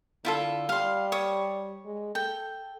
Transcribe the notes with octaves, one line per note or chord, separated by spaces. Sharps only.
D3 E4 F4 A4
G3 F5 C6
C#5 D#6
G#3
A4 G5